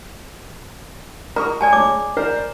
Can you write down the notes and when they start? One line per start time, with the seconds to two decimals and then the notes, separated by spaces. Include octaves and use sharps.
1.36 A#4 A#5 C#6 D#6
1.61 D5 G#5 A5
1.73 G#3 C#5 D6
2.17 A#4 C5 D5